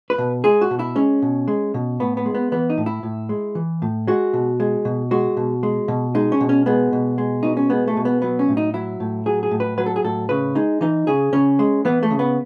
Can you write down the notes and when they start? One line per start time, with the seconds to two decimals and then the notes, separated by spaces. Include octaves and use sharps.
0.10 B4
0.18 B2
0.44 G#3 G#4
0.61 F#4
0.71 B2
0.79 E4
0.96 G#3 C#4
1.22 B2
1.48 G#3
1.74 B2
2.00 A2 B3
2.17 B3
2.26 G#3
2.35 B3
2.52 E3 B3
2.70 D#4
2.78 A2
2.86 E4
3.03 A2
3.29 G#3
3.55 E3
3.82 A2
4.07 G#3 F#4
4.33 B2
4.60 G#3
4.85 B2
5.11 G#3 F#4
5.37 B2
5.63 G#3
5.88 B2
6.15 G#3 D#4
6.32 C#4
6.41 B2
6.49 C#4
6.66 G#3 B3
6.93 B2
7.18 G#3
7.43 B2 D#4
7.57 C#4
7.70 G#3 B3
7.88 A3
7.97 B2
8.05 B3
8.22 F#3 B3
8.39 C#4
8.48 A2
8.57 D#4
8.74 F#3 E4
9.00 A2
9.26 F#3 G#4
9.43 G#4
9.51 A2
9.60 B4
9.78 F#3 B4
9.86 A4
9.96 G#4
10.04 A2 A4
10.29 C#3 B4
10.55 G#3 D#4
10.81 E3 D#4
11.07 C#3 G#4
11.33 C#3 C#4
11.59 G#3
11.85 E3 B3
12.03 A3
12.11 C#3
12.19 B3